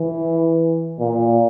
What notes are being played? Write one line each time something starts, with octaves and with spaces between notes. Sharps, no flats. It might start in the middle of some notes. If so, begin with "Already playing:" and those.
Already playing: E3
A#2